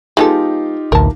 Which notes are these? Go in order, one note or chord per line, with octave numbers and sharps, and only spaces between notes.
G#3 B3 D#4 F4 G4 A4
A1 D2 A#4 A5